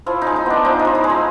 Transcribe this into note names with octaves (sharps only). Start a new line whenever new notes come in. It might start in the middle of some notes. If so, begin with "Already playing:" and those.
F3 E4
D#4
G#3
D#4
B3 D4
F3 D#4
D#4
F3
E4
G#3
D#4